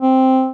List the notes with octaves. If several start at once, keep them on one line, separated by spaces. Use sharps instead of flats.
C4